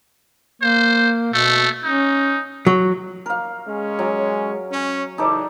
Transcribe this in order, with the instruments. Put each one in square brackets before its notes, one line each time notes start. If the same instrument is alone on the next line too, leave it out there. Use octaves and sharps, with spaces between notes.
[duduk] A#3 [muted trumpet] C5
[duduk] B2 [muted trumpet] A3
[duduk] C#4 [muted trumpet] D#4
[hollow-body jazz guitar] F#3
[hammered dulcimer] A#4 F5
[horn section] G#3 C#4
[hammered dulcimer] F#3
[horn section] C#4
[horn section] C#3 E3 [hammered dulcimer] D#4 A4 D5